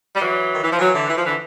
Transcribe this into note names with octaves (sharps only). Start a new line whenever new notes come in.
G3
E3 F#3
D#3
E3
F3
E3 F#3
D3 E3
E3
F3
D3 E3